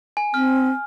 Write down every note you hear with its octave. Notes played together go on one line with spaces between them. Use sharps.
G#5
C4 F6